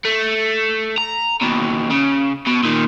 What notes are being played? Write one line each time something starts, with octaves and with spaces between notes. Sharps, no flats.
A3
A#5
D#2 B2
C#3
B2
A#2 D#3